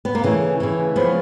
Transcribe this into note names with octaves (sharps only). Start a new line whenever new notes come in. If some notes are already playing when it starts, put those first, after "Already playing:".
B3
A#3
C#3 E3 A3
C#3 E3
C#3 F3 B3